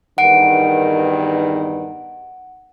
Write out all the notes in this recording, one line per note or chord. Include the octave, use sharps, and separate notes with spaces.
E2 G2 D#3 F#5 D7